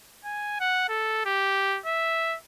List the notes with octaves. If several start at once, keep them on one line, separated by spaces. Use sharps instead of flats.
G#5
F#5
A4
G4
E5